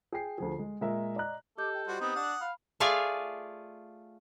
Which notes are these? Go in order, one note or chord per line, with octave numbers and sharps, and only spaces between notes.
G#4 G5 C7
D2 F3 G#4
G#3
A#2 G#3 A#4 E5
D5 D#5 A#5 F#6
G4 A4 D#5 D6 G6
G5
G3 F4 F#4 C5
B3 C4 D#4 D#6
D4 F#5
F5 B5
A3 F4 G#4 D5 F5 G#5